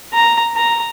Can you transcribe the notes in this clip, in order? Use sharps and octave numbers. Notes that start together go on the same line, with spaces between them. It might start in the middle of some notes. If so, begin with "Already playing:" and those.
A#5
A#5